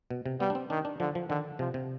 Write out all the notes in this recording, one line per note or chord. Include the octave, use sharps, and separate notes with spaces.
B2
C3
G3 B3
D4
C4
D#3 D4
D4
D3 F3
F3
D3 D#3
C3 F3
C3